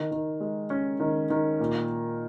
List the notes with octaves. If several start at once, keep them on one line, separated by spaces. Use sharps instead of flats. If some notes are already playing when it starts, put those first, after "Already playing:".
Already playing: D#3
D#3
G#3
C#4
D#3
D#3
A#2